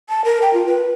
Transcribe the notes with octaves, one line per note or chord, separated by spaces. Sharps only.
A5
A#4
G5
F4
B4